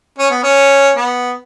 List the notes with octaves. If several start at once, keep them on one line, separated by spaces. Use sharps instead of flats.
C#4
B3
C#4
B3